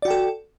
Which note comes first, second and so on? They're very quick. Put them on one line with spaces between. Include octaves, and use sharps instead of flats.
D5 F#4 G5 A4